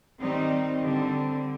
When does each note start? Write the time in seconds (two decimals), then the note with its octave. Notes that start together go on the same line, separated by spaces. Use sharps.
0.20 D#3 G3 C4 D#4
0.84 D3 G3 C4